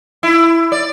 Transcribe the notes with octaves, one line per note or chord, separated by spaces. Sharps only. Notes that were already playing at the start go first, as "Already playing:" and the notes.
E4
D5